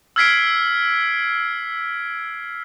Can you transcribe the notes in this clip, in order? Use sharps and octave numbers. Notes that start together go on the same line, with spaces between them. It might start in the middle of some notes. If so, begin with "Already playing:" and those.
E6 F6 G#6 B6 C7 D7